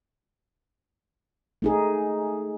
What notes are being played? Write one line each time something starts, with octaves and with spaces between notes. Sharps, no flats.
A3 D#4 G#4